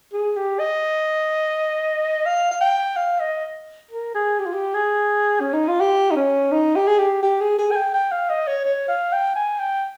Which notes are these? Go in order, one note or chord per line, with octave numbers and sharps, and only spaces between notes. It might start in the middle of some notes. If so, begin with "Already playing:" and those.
G#4
G4
D#5
F5
F5
G5
F5
D#5
A#4
G#4
G4
F4
G4
G#4
C#4
D#4
F4
G4
D#4
C#4
D#4
G4
G#4
G4
G4
G#4
G#4
G#5
G5
G5
F5
D#5
C#5
C#5
F5
G5
G#5
G5